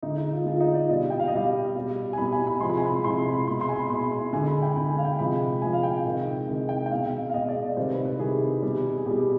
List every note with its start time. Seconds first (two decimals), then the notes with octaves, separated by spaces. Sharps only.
0.02 D3 G#3 D#4
0.18 D#4
0.32 F4
0.46 D3 G#3 F4
0.56 F4
0.60 D#4
0.74 D5
0.89 B2 G3 D#5
1.10 G5
1.20 F5
1.28 D#5
1.32 B2 G3 F5
1.75 B2 G3
2.13 G#5
2.18 B2 G3 B5
2.32 G#5
2.47 B5
2.60 C3 F3 G#3 C6
2.70 B5
2.77 G#5
2.85 B5
3.04 C3 F3 G#3 C6
3.19 B5
3.33 B5
3.47 B2 G#3 C6
3.61 C6
3.69 G#5
3.76 B5
3.86 B5
3.90 B2 G#3 C6
4.12 B5
4.33 D3 G#3 G#5
4.48 B5
4.62 G5
4.76 D3 G#3 B5
4.91 G#5
4.98 F5
5.04 G5
5.19 C3 F3 G#3 B5
5.62 C3 F3 G#3 G#5
5.73 F5
5.83 G5
6.05 C3 D#3 G#3
6.49 C3 D#3 G#3
6.69 G5
6.86 G5
6.91 B2 G#3 F5
7.30 F5
7.34 B2 G#3 D#5
7.49 D5
7.62 D#5
7.77 C3 D#3 G3 C5
7.91 B4
8.05 B4
8.19 C3 D#3 G3 G#4
8.62 B2 G3
8.97 G#4
9.06 B2 G3 G4